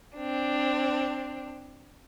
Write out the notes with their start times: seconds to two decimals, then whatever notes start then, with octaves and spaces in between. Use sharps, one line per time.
0.17 C4 D4